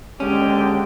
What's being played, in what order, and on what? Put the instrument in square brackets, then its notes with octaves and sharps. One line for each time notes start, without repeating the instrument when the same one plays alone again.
[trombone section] D#2 D3 G#3 [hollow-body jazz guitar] C#4 [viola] G4 G5